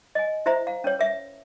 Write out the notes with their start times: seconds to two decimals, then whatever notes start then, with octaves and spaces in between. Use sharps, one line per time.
0.15 D#5 G#5
0.46 E4 C5 E5 A#5
0.67 F5
0.84 C#4 B4 C#5
0.99 A#4 E5